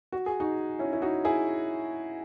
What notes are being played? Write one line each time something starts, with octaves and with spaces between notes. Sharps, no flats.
F#4
G#4
D#4 F#4
C#4 E4
E4
D#4 F#4
E4 G#4